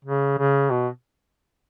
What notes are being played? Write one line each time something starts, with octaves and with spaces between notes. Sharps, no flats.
C#3
C#3
B2